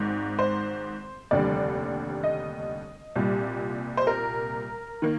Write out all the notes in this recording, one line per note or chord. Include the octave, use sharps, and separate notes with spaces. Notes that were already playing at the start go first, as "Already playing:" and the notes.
Already playing: G#1 G#2 D#3
C5
F1 D#2 D3 G3 D5
D#5
C2 A#2 G3
C5
A#4
D#3 A#3